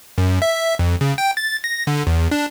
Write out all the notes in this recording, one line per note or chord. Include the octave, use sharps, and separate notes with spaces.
F#2
E5
F2
C#3
G5
A6
A#6
D3
E2
D4